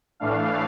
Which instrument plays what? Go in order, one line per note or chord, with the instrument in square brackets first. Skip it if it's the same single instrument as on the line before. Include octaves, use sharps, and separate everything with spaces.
[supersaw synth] A2 E3 A3 D4 F5